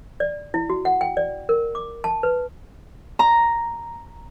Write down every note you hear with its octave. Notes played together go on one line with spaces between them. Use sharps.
D5
E4
F#4
F#5
G5
D5
A#4
D6
A5
B4
A#5